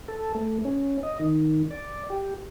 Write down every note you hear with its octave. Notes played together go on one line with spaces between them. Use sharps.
A4
A3
C#4
D#5
D#3
D5
G4